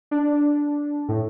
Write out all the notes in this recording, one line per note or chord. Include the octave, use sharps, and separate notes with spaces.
D4
A2